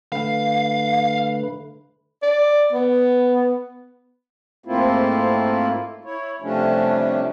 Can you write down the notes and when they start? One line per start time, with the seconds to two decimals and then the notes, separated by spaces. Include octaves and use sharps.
0.12 D3 A3 B4 F5
2.23 D5
2.73 B3
4.65 G#2 A3 A#3 C4 E4 F4
6.05 E4 C#5
6.42 C3 F3 G3 A3 C#4 D4